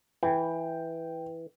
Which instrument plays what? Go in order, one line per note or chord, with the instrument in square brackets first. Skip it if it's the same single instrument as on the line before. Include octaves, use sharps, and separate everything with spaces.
[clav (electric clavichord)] E3 [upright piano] G5